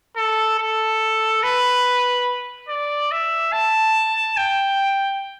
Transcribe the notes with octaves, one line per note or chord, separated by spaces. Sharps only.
A4
A4
B4
D5
E5
A5
G5